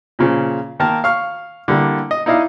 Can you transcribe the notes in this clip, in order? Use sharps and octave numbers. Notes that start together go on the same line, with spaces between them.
A#2 C#3 F3
D#3 A#3 A#4 A5
F5 C#6 F6
D3 G3 A#3 E4
D#5
D#4 E4 D5 D#5 F5